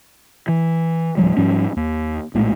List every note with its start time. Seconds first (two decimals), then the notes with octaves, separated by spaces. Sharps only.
0.48 E3
1.17 D1 E2 F3 G3
1.37 G#2 F3 G3 C#4
1.77 D#2
2.34 A#1 A2 G#3 A3